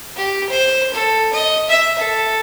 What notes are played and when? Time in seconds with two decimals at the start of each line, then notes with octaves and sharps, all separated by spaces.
0.16 G4
0.49 C5
0.93 A4
1.33 D#5
1.68 E5
1.98 A4